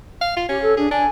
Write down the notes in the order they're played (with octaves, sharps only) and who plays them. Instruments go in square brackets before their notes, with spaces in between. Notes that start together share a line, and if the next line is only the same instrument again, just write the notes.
[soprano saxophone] F5
F4
[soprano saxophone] C#4 [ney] G4
[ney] A4
[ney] D4 [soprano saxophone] G#4
[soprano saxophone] D4 [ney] G#5